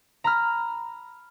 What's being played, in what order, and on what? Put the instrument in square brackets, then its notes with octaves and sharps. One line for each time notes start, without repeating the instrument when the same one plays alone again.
[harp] A#5 B5 F6